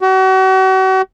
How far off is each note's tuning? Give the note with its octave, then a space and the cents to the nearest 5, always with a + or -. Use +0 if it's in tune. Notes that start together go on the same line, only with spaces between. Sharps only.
F#4 +40